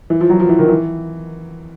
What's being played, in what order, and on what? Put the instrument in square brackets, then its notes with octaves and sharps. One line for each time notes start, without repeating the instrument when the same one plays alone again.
[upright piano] E3
F3
F#3
F3
E3
D#3
E3